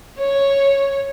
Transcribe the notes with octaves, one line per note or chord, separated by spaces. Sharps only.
C#5